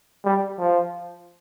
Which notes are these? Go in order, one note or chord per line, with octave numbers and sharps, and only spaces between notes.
G3
F3